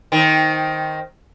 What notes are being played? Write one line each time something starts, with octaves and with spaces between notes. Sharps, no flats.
D#3 C4